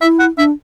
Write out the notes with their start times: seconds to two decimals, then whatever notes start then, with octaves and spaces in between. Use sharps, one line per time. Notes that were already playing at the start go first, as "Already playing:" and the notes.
0.01 E4 E5
0.20 F#5
0.38 D4 E5